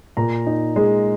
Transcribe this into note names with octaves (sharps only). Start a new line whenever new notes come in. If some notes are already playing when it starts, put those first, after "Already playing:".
A#2 A#5
D#4
G#3